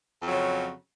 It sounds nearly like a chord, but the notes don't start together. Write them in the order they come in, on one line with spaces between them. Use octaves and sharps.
F2 F#3 C#3